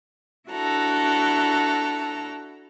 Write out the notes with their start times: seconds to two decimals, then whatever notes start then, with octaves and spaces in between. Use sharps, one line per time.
0.49 D4 E4 F#4 A4 A#5